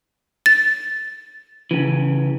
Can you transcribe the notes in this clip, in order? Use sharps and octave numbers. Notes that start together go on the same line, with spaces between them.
A6
C#3 E3